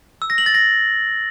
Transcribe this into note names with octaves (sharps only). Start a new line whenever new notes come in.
E6
A#6
F#7
A6
A#6